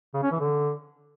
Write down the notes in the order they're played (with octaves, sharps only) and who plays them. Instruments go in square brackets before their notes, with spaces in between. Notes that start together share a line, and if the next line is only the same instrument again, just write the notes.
[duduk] C#3
C#4
E3
D3